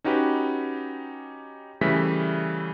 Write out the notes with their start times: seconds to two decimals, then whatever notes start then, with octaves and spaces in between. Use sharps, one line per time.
0.04 C#4 D#4 F#4 G4 B4
1.81 C#3 E3 G3 A3 B6